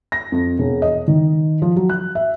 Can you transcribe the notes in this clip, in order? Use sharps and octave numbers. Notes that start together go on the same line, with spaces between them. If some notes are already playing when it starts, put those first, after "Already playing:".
A#6
F2
E1
D#5
D#3
F3
F#3
F#6
E5